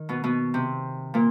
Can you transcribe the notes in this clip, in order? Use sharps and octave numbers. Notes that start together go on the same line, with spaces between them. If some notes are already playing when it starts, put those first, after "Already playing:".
Already playing: D#3
B2 B3
B2 B3
C3 C4
A#2 A#3